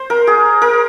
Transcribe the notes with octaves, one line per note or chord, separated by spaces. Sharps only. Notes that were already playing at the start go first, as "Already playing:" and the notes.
Already playing: C5
A#4
G#4
A#4